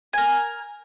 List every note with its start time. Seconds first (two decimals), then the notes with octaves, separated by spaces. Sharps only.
0.13 A#4 G#5